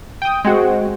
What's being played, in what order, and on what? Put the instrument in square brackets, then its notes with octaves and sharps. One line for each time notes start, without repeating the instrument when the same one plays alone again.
[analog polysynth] G5 D#6
G#3 C4 F#4